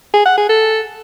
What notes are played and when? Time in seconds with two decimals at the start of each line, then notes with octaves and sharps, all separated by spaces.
0.14 G#4
0.26 F#5
0.37 G#4
0.49 A4